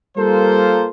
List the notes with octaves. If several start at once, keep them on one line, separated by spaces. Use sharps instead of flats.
G3 A#3 F4 A4 A#4 C5